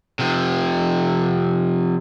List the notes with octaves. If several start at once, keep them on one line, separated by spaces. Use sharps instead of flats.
C3 F3